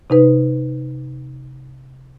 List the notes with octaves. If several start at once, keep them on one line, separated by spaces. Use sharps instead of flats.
C3 D#4 B4